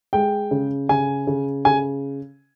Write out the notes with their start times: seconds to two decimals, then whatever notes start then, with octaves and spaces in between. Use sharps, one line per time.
0.13 G#3 G5
0.51 C#3
0.89 C#3 G#5
1.27 C#3
1.65 C#3 G#5